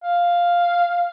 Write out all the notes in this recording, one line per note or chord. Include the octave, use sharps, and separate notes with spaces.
F5